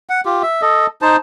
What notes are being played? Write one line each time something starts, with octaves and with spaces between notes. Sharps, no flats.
F#5
F4 G4
E5
A4 D#5
D#4 C5 A5